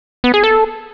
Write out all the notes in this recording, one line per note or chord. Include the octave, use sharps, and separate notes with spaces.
B3
G#4
A4